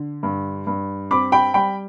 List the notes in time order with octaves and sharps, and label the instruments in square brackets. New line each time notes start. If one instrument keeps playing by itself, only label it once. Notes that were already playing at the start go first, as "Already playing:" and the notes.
Already playing: [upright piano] D3
G2
G2
C4 B5 D6
G5 B5
G3 G5 B5